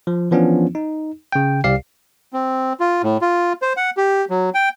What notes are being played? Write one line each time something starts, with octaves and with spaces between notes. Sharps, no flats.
F3
E3 F3 B3 C#4 D4 F4
D#4
C#3 G5
C2 G4 D5 F5 C7
C4
F4
A2
F4
C5
F#5
G4
F#3
G5